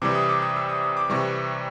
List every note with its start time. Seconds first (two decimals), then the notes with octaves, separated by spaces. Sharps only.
0.02 C3 E3 G3 D6
0.15 D#6
0.29 D6
0.42 D#6
0.56 E6
0.69 D#6
0.83 D#6
0.97 D6
1.10 C3 E3 G3 C#6